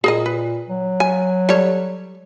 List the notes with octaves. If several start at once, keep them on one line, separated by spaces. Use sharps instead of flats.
A#2 G#4 A#4 D#5
B4
F#3
G#5
G3 A4 C#5